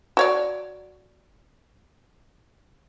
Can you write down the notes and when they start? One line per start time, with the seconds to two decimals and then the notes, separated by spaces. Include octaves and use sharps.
0.17 F#4 C#5 D5